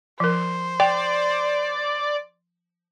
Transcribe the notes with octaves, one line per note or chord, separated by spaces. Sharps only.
F3 A#4 C5
D5 G5